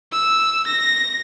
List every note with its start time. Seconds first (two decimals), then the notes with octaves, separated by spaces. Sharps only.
0.12 E6
0.67 A#6